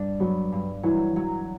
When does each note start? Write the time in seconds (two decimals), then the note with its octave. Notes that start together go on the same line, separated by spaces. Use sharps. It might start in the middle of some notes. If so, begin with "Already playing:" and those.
Already playing: G2 D4
0.20 F#3 B3
0.52 G2
0.83 E3 F#3
1.16 F#3